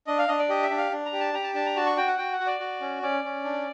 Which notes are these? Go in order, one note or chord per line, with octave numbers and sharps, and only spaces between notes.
D4 D#5
F5
D4 D#5
D5
G4 D#5
E5
D4
F5
D4
A#5
G4
A5
G4 A#5
A5
D4 A5
A#5
F#4 A5
C#6
F#4 G5
F#5
F#4 G5
F#5
F#4
D5
F#4
C#4
C#4 D5
C#4
D4